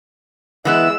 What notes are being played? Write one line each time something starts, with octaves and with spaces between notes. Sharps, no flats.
E3 G#3 B3 E4 E6